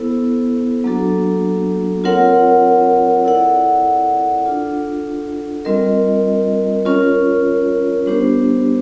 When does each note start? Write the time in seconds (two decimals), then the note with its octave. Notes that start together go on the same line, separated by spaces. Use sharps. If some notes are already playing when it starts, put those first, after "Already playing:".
Already playing: B3 E4 A4 C5
0.84 F#3 A#3 D4 F#4 A4
2.04 C4 F4 A#4 C#5 F#5
3.24 E4 A4 D5 F#5
4.45 D4 F4 A4
5.65 G3 C4 F4 A#4 D#5
6.85 C#4 F4 A#4 C#5
8.06 G3 B3 D4 G4 C5